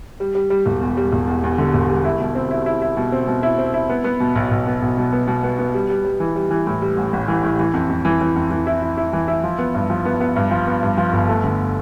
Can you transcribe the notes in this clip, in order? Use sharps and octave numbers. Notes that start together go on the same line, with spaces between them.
G3
G3
G3
E1
E2
G3
E1
E2
E2
D3
E1
G3
E4
B2
C4
E4
E4
E4
B2
C4
B2
E4
C4
E4
B3
B3
B2
B1
B1
B3
B1
B2
B3
B2
B3
B3
G3
G3
G3
E3
G3
E3
A2
G3
A1
A1
E3
A2
E3
F2
F2
E3
E3
F2
E3
E4
E4
E4
E3
E4
F3
B3
G2
F3
B3
B3
G2
F3
B3
G2
F3
G1
A3
D3